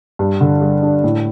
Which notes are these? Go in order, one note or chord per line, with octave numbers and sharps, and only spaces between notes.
G2
D3
G3
D4
A2